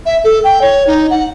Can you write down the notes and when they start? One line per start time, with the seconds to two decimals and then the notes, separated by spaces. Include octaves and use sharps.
0.06 E5
0.24 A4
0.44 G5
0.62 C#5
0.87 D#4
1.10 F#5